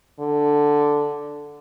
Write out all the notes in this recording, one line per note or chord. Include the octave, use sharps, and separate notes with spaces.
D3